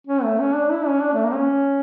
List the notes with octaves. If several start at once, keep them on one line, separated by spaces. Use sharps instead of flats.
C#4
A3
C#4
D4
E4
C#4
D4
A3
A#3
C#4